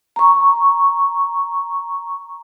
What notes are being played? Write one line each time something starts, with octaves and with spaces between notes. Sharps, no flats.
A#5 C#6